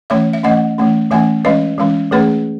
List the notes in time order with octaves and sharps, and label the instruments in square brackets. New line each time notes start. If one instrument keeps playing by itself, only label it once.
[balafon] E3 A3 C#4 C#5 E5
E5
E3 A3 C#4 D#5 F#5
E3 A3 C#4
E3 A3 C#4 E5 G#5
E3 G#3 C#4 B4 D#5
E3 G#3 C#4
E3 A3 C#4 G#4 B4